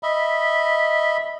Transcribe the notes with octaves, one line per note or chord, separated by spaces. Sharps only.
D#5 E5 B5